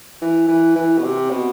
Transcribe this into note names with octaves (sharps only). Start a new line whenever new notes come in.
E3
E3
E3
B2
C3
B2